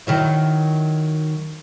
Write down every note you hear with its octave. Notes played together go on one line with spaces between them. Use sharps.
D#3 F#3 E4